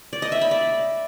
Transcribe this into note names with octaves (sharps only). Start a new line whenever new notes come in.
D5
D#5
E5
B5
D5